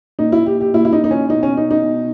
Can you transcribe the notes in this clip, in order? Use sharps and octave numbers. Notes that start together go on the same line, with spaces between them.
A#2 D#4
E4
G4
G4
A#2 E4
E4
D#4
D#4
C#4
B2 D#4
C#4
D#4
D#4
B2